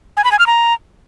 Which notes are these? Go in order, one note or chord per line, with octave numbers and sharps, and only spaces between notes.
G#5
B5
G#5
F6
A#5